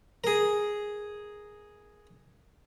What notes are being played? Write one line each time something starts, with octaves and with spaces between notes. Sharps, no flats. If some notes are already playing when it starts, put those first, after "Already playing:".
G#4 A#4